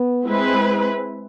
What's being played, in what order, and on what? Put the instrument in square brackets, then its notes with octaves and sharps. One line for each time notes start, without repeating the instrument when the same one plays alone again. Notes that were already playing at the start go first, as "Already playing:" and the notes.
Already playing: [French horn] B3
[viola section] G#3 C4 E4 B4